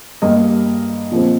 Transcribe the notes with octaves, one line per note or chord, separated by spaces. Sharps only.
G2 G3 A#3 D#5
A#2 F3 C4